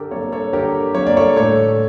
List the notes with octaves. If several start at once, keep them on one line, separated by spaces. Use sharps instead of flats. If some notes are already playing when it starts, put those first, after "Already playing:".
Already playing: D3 G4 A4 A#4
G3 A#3 A4 C#5
A4 C#5
D3 G4 A#4
G3 A#3 C#5
D5
A4 C#5
A2 A4 C#5